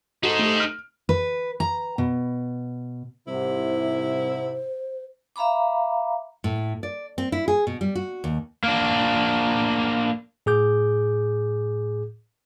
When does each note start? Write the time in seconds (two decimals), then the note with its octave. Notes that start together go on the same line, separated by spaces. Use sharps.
0.23 D#4 F#4 A4 C5
0.39 A3 G4
0.60 F6 D7
1.09 B4
1.60 A#5
1.98 B2
3.28 C2 G#2 C3 E4 C5
5.36 E5 F5 A#5 B5 D6
6.44 A2
6.83 D5
7.18 C4
7.32 E4
7.48 G#4
7.67 B2
7.81 G3
7.95 F#4
8.24 D#2
8.64 A#3 D4
10.46 A2 G#4 D6 G6